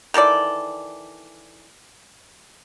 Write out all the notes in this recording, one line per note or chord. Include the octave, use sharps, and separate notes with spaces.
D#3 E3 A4 D5